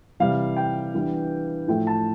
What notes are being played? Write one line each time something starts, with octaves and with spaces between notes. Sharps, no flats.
C3 E3 G3 F5
G5
E3 G3 B3 D4
A2 F3 A3 G5
A5